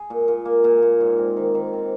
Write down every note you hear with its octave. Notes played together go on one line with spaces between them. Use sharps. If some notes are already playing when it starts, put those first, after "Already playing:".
Already playing: G#4
A#2
A#2
A#3
A#2
A#2
G#2
C4
D#3
D#3
C4